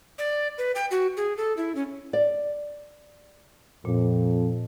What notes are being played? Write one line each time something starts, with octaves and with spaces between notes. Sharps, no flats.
D5
B4
G5
F#4
G#4
A4
E4
C#4
D5
F2 A#2